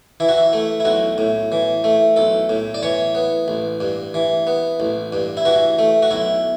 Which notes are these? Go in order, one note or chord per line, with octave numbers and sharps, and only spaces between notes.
E3 E4
F#4
E4
A3
E4
B1 F#4
A2
E3
A3
B1 A4
A2
D5
E3 C#5
B3
A1
G2
E3
B3
A1
G2
E4
E3 F#4
A3
F#4
B1 E4